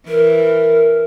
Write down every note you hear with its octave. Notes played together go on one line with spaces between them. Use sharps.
E3 A#4